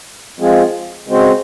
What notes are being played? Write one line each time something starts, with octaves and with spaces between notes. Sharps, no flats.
F3 G#3 C4 F4 G#4
C#3 G#3 C4 F#4 C5